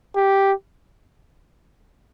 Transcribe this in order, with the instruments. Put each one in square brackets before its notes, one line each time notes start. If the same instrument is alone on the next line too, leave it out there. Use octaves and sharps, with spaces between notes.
[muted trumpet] G4